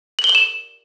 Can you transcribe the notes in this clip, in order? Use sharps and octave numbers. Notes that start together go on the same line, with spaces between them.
F#7
G7
F#7
E7